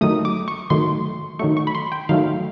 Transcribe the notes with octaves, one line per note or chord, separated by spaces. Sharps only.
D#3 F#3 A3 D#6
D6
C#6
D#3 F#3 A3 C6
D#3 F#3 A3 C#6
C#6
B5
C6
G5
D#3 F#3 A3 F5